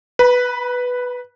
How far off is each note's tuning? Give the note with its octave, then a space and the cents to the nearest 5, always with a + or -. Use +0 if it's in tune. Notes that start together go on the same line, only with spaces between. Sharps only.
B4 +0 B5 -45